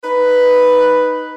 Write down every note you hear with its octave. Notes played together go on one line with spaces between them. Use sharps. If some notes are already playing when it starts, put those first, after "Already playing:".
D#4 B4